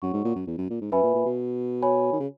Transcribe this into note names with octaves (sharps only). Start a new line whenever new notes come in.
F#2 F#4 C#5 F#5 C#6
G#2
A#2
F#2
E2
F#2
A#2
G#2
F#2 B4 E5 G#5 B5
A#2
A#2
B2
F#4 C#5 G#5 B5
D#3
C#3